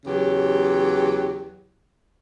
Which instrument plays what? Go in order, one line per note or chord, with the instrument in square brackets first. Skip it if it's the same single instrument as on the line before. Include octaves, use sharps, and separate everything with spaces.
[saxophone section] E2 C#3 F#3 G4